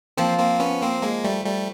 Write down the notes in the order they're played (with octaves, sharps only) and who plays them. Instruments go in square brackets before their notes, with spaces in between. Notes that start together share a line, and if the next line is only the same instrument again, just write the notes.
[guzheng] F3 [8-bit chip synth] A#3 C4
[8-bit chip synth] A#3 C4
B3 C#4
A#3 C4
G#3 A#3
G3 A3
G3 A3